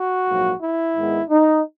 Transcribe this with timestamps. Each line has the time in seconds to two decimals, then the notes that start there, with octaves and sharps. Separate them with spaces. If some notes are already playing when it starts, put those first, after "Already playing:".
Already playing: F#4
0.27 A#1 G#2 F#3 A#3
0.61 E4
0.96 G#2 D#3 G#3 B3
1.30 D#4